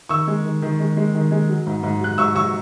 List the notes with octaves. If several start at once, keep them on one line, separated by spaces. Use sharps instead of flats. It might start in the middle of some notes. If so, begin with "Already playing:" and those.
D#3 C#6 E6
G#3
D#3
D#3
G#3
G#3
D#3
G#3
F#3
G#2
G#2
F#3 F#6
G#2 C#6 E6
F#3 C#6 E6